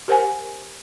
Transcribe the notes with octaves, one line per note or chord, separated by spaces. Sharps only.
G4 A#4 C5 F#5 G#5